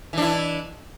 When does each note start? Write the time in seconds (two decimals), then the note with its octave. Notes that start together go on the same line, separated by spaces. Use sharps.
0.13 E3
0.18 D4
0.22 E4